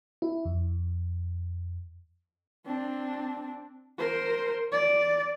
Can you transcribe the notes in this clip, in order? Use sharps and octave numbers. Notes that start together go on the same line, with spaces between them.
E4
F2
C4 D4
A#4 C5
D5